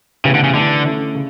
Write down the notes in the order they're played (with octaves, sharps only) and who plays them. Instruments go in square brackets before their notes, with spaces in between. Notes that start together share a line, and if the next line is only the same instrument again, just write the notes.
[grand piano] A2 E3 B3 E4 G4 [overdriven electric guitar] C#3
[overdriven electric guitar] D3
C#3
[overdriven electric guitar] D3 [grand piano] E3 A3 E4
[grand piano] D3 A3 C#4 E4
C#3